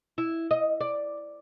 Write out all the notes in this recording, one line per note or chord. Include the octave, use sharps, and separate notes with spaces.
E4
D#5
D5